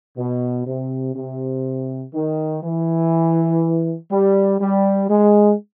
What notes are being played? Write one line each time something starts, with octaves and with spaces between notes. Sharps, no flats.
B2
C3
C3
D#3
E3
G3
G3
G#3